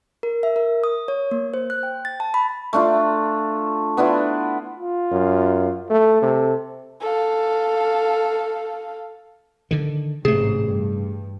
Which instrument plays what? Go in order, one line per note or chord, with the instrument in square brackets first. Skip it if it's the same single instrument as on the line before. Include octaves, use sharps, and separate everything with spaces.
[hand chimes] A#4
E5
A#4
D#6
C#5
A#3
C5
F#6
G5
A6
A5
B5
[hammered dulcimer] A3 D4 F4
B3 D4 E4 F4
[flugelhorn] F4
[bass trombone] F#2
[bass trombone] A3 [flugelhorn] A4
[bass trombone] C3
[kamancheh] A4 F5
[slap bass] D3 D#3
[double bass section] A1 G#2 [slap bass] C3 A3 [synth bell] G#4
[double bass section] G2